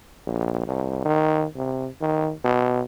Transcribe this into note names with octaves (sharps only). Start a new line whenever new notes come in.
A#1
C2
D#3
C3
D#3
B2